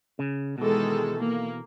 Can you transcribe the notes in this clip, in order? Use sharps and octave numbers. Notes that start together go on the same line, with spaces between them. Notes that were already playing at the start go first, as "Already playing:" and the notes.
C#3
B2 D#3 E3 G#3 A4
A#3